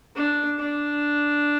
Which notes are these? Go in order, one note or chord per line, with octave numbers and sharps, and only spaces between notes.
D4
D4